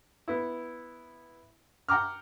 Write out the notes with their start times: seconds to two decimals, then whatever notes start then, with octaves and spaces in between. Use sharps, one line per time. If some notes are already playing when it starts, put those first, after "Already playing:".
0.28 B3 E4
1.89 F#5 G5 A#5 D6 F6